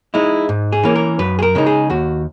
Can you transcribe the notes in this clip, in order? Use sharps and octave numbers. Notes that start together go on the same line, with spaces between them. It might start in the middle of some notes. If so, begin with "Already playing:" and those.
G#3 D#4 E4
G#2
G#4
E3 A#3 C#4
A#4
F#2 B4
G#4
A#4
C#3 G#3 D#4
G#4
D#2 F#4